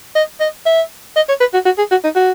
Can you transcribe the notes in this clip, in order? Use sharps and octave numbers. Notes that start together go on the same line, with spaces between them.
D#5
D#5
E5
D#5
C#5
B4
F#4
F#4
G#4
F#4
D#4
F#4